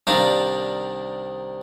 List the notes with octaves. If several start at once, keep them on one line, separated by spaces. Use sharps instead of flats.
C2 D#3 G3 D4 F5 A#5